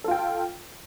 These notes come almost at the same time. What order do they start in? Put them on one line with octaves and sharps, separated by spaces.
A4 F4 G5